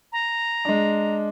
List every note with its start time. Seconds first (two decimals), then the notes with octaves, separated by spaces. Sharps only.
0.12 A#5
0.65 G#3 D4